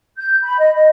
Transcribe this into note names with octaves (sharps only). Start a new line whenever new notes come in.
G6
B5
D#5
D#5